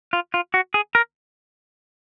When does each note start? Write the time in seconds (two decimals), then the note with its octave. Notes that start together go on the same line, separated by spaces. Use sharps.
0.13 F4
0.34 F4
0.54 F#4
0.74 G#4
0.95 A#4